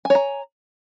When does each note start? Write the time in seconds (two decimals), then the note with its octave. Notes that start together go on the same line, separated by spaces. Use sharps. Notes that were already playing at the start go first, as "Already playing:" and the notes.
0.05 G#5
0.10 C#5
0.15 A#5